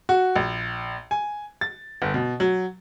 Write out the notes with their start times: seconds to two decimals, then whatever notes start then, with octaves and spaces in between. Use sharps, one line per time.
0.09 F#4
0.36 A#1
1.11 G#5
1.61 A6
2.02 G1
2.14 B2
2.40 F#3